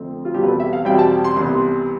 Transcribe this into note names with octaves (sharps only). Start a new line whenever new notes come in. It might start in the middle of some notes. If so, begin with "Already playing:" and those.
Already playing: F2 D3 A3 C4
F4
E2 B2 G3 C4 G4
B4
A4
E5
F5
E2 B2 G3 C4 G5
A5
C6
C2 C3 E3 B3 C6